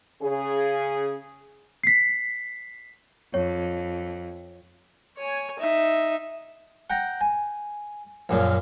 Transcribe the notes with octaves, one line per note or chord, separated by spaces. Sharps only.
C#3 G#4
B6 C7
F2 C#5
C#5 G#5
D#4 E5
F#5 G5 A#5
G#5
A#1 F#2 A#2 C#3